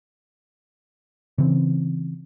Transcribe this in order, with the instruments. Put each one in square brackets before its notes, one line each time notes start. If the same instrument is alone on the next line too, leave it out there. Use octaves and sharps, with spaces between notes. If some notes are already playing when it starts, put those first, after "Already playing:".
[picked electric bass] C#3 E3 C4